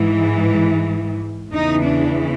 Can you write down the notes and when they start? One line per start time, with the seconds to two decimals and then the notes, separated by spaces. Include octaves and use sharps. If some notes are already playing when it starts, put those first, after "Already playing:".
Already playing: G#2 E3
1.53 E2 C#3 E3 D#4
1.83 D4